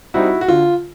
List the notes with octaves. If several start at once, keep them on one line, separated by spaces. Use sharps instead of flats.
G3 C4 D#4 E4 F#4
F#4
D3 F4